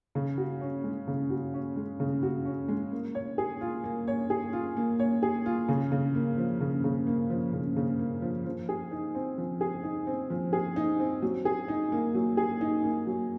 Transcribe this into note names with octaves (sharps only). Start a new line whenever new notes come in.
C#3
F#4
C#4
G#3
C#3
F#4
C#4
G#3
C#3
F#4
C#4
G#3
A#3
C#5
G#4
F4
A#3
C#5
G#4
F4
A#3
C#5
G#4
F4
C#3
C#3
A#3
F3
C#3
C#3
A#3
F3
C#3
C#3
A#3
F3
F3
G#4
D#4
C4
F3
G#4
D#4
C4
F3
G#4
D#4
C4
F#3
G#4
D#4
A#3
F#3
G#4
D#4
A#3
F#3